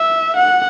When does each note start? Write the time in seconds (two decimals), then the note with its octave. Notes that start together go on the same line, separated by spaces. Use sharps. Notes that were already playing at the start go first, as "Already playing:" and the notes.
Already playing: E5
0.36 F#5